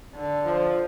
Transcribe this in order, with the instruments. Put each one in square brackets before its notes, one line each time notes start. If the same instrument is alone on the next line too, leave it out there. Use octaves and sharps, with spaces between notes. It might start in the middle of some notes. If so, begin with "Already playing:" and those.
[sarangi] D3
[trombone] F3